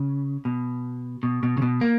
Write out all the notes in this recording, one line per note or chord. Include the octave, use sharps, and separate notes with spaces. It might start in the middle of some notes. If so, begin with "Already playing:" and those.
Already playing: C#3
B2
B2
B2
C#3
B2
A#3